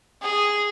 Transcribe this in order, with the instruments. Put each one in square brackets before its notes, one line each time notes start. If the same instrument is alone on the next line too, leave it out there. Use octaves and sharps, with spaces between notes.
[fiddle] G#4